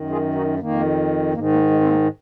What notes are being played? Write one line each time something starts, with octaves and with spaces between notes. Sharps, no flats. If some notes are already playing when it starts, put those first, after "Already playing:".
Already playing: F#2 D#3
F4 G#4
D#4 F#4
F2 D#3 A#3
G#2 D#3 A#3
A#3
G#3
C4
A#3